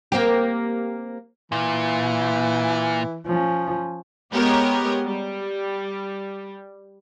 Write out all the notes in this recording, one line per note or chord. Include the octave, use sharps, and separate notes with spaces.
A#3 C4 G4
A#2 E3
F3 C#4
G#3 B3 G4 A#4 C#5 D#5
G3